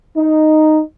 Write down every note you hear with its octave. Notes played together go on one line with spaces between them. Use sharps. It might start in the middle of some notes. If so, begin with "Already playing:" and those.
D#4